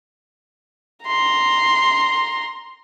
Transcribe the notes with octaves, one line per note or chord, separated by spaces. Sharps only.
A#5 C6